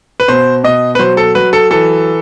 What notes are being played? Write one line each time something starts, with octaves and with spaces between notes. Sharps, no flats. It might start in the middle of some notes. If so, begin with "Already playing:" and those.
B4
B2 C5
B2 D#5
B4
F#3 C5
A4
F#3 B4
A4
E3 A4